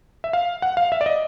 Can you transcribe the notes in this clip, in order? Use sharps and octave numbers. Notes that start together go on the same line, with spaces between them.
E5
F5
F#5
F5
E5
D5
D#5